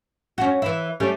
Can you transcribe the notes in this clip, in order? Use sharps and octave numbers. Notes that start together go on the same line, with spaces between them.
C#4 F#4
E3 E4
G3 A3 C#4